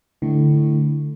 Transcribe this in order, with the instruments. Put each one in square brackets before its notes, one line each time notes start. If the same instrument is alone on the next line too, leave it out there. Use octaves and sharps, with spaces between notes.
[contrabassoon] A2 [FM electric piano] D3